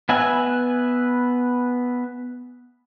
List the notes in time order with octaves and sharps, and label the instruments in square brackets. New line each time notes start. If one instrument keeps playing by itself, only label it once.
[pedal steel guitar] B3 B4 E5 G#5